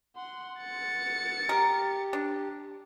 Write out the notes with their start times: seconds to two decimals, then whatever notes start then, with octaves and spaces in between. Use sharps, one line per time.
0.16 F#5 C6
0.61 A6 C#7
1.49 G4 A#4
2.13 D4